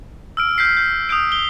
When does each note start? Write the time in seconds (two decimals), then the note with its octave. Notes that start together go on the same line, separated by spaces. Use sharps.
0.37 E6 F6 D7
0.58 F6 G6 B6 C7
0.77 G6
1.09 D#6 F6 G6 D7
1.32 G7